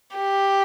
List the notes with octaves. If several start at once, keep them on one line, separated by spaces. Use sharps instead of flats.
G4